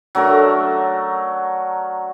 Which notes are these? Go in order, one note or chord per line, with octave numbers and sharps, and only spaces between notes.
F#3 A3 D4 A#4